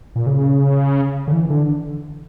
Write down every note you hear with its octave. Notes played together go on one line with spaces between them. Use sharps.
A#2
C#3
D3
E3
D3